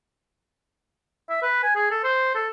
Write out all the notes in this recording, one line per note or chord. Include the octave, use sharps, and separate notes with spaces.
E5
B4
G#5
G#4
A4
C5
A4